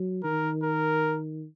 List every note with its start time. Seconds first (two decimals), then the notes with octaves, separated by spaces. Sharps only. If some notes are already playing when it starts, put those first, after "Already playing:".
Already playing: F#3
0.23 D#3 A#4
0.63 A#4